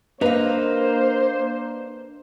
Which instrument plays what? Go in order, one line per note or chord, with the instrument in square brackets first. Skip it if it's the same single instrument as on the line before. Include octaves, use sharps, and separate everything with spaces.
[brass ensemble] A#3 [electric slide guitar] D4 D#5 A#5 [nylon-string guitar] B4 F5 [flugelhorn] C5